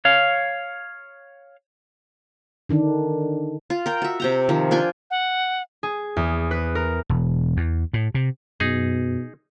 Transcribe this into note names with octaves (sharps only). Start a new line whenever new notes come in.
C#5 F5
D3 D#3 D4
F4
A#4 G5
F#4 E5
C3 G5 A#5
D#3 F3
D4 F4 G5 G#5
F#5
G#4
E2
B4
A#4
E1
E2
A2
C3
F#2 B2 D#4 G#4